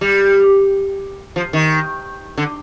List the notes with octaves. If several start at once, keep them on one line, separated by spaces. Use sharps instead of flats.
G3
F3
D#3
D3